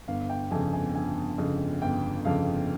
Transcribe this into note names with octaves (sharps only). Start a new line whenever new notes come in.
G1 F5
G5
F2 C#3 G#5
G#5
G1 G#5
F2 C#3
G1 G5
F2 C#3 F5